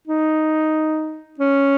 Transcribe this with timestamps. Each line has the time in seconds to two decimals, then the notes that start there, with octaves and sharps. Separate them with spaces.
0.07 D#4
1.39 C#4